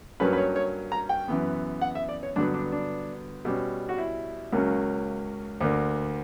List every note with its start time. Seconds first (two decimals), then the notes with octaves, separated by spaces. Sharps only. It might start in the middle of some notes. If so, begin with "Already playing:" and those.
0.20 G2 F#3 A#3 C#4 B4
0.33 B4
0.38 C#5
0.56 C#5
0.92 A#5
1.09 G5
1.28 F#2 E3 B3
1.81 F#5
1.95 E5
2.09 D5
2.23 C#5
2.36 G2 D3 F#3 B3 D4
2.54 D4
2.72 D4
3.45 B2 G3 C#4
3.89 F#4
3.98 E4
4.53 C#2 C#3 F#3 A#3 C#4
5.61 D2 D3 A#3